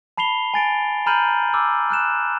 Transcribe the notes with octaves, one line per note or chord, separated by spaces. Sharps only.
A5 B5 C7 F7 G7
G#5 A6 D7
A#5 B5 F6 G6 D#7 F#7
D6 E6 F6
F6 F#6 E7